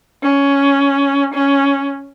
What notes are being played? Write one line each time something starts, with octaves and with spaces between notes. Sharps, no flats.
C#4
C#4